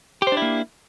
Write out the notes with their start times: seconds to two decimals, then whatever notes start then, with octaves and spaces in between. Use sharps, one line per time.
0.22 G4
0.27 C5
0.32 D4
0.37 E4
0.42 A#3